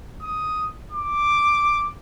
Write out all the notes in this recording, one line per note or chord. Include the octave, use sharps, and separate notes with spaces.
D#6
D6